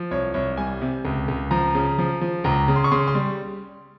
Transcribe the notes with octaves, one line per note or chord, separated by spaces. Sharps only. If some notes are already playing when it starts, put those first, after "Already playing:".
Already playing: F3
C2 C#5
C2 C#5
G3 G#5
C3
C#2
C#2
F3 A#5
C#3
F3
F3
C#2 A#5
C#3
C6
C#6
C#3 C6
C6
G3